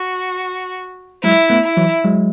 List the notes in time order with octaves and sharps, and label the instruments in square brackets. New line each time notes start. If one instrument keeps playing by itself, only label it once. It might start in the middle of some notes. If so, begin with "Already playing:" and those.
Already playing: [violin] F#4
[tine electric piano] F#3 G#3 [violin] E4
[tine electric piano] A3 B3
[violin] E4
[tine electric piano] E3 F#3
F#3 G#3